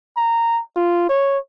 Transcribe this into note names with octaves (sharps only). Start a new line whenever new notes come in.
A#5
F4
C#5